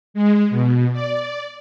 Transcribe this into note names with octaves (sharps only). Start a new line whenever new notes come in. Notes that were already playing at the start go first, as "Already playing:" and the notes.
G#3
B2
D5